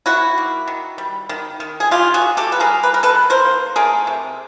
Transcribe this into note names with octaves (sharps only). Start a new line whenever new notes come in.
D#3 E4 F#4
A#3
D#3
G3
D#3
D#3
G#4
D#3 F4 G4
F#4 G#4
D#3
G4 A4
G3 B4
G#4 A#4
G3 B4
A#4
A4 B4
D#3
A#4 C5
A#3
A3 G#4 A#4
C3